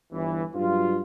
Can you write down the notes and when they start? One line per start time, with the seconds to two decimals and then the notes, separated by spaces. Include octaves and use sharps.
0.12 G1 E3
0.55 G2 F#3 F4